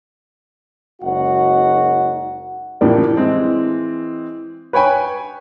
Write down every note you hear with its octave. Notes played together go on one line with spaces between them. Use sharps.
F#1 G#3 D#4 F#4 F#5
A2 C#3 E3 F3 G3 A#3
E3 G#3 C4
B4 C#5 G5 G#5 B5